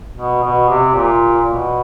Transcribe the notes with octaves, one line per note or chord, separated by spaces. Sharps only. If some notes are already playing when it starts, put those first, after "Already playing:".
B2
B2
C3
A#2
B2